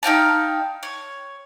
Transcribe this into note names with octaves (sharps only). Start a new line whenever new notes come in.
D#4 F5 G5 A5
C#5